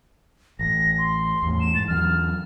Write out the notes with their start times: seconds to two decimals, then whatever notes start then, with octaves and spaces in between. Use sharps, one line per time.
0.59 A1 A#6
0.98 C6
1.43 E2 A2
1.60 E7
1.75 G#2 A6
1.88 E2 F#3 F6